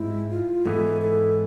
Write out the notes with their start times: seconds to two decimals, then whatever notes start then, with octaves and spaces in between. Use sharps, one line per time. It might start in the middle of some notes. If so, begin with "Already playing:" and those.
Already playing: G#2 G#3 C4 E4
0.30 F4
0.66 G#2 E3 B3 E4 G#4 A4
1.01 A4